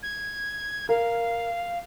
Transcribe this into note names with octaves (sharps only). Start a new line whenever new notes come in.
G#6
A#4 F5